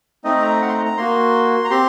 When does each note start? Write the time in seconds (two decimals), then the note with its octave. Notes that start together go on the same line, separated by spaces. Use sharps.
0.24 A3 C4 D#4 D#5
0.43 A#5
0.61 F#5
0.69 C6
0.73 A#5
0.85 A#5
0.97 A#3 F#4 C6
1.64 A#5
1.70 C4 G4 C6